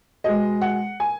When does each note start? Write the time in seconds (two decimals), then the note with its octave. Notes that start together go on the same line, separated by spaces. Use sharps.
0.24 B2 G#3 D#5
0.62 F#5
1.00 G#5